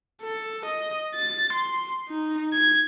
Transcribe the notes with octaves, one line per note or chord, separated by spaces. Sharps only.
A4
D#5
A6
C6
D#4
G#6